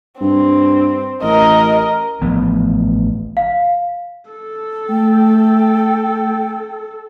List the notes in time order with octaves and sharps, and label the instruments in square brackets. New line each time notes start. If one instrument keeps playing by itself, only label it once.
[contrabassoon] G2 [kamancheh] C4
[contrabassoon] A1 [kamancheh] A#4 D#5
[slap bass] A1 F3 B3
[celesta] F5
[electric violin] A4
[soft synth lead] A3 [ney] G5